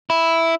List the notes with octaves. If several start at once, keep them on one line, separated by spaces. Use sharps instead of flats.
E4